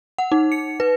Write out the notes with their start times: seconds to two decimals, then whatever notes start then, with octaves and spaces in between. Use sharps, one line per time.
0.18 F#5
0.32 D#4
0.52 C#7
0.80 B4